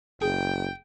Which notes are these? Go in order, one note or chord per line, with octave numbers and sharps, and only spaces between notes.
F#1 G#4 G5